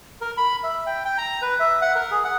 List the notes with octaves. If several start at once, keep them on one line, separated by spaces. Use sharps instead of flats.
A#4
B5
E5
G5
G5
A#5
B4
E5
F#5
A#4
G#4
F#5